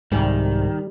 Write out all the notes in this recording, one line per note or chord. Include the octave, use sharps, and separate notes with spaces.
C2 G#2 D#3 G3